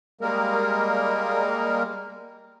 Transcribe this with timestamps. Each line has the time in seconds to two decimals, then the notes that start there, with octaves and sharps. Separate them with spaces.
0.21 G3 G#3 A#3 A#4